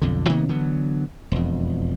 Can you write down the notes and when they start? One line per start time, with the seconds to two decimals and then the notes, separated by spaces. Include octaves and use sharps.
0.02 B1 F2 D3
0.29 C3 D#3 A#3 B3
0.49 D3 E3 F#3 B3
1.32 E1 F2